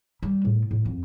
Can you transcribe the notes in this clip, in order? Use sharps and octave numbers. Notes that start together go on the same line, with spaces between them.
G3
A2
A2
F2